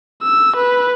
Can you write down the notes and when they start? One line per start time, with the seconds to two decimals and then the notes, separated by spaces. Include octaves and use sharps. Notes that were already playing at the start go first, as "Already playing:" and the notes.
0.23 E6
0.56 B4